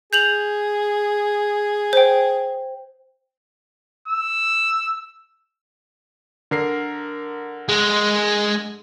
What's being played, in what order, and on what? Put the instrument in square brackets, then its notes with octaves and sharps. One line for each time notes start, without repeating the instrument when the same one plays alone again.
[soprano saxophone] G#4 [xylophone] G6 F7 F#7
[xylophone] C5 G5
[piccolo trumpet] E6
[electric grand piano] D3 A#4 C7
[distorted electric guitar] G#3